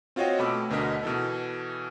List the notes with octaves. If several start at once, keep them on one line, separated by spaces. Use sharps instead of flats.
C4 F4 F#4 C#5 D#5 G5
B2 A3 B5 D6 E6
D2 B2 D3 A#4 D#5 B6
B2 E3 A4